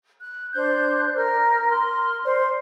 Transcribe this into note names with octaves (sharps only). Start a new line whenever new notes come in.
F#6
D4 C5 F#6 G6
A#4 F6
C6 F6
C5 D5